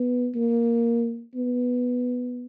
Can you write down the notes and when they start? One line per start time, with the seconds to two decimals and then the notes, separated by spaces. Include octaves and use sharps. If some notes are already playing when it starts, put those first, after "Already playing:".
Already playing: B3
0.35 A#3
1.35 B3